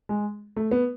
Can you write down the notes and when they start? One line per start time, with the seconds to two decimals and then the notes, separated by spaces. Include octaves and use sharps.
0.09 G#3
0.57 A3
0.71 B3